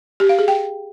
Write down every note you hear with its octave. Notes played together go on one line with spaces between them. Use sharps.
G4
F5
G#4
G5